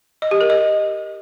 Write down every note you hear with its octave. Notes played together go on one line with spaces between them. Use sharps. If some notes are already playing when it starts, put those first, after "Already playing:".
D#5
G4
A#4
D#5